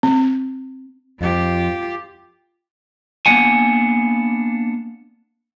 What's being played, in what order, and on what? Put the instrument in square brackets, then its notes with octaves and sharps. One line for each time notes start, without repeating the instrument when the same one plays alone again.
[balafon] C4
[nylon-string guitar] F2 [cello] F4 G4
[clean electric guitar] A#3 B3 D4 F#5 G#5